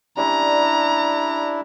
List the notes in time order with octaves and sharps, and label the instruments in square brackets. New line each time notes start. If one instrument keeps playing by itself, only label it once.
[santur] G3 C#4 C#5 [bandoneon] D4 E4 [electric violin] A#5